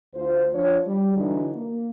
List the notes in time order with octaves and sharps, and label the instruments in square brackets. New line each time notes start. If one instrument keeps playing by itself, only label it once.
[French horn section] D2 F4 C5
F3 D4 F4 C#5
G3
D3 E3 F#3 D4 D#4
A#3